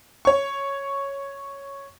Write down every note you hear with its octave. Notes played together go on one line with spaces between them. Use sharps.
C#5 C#6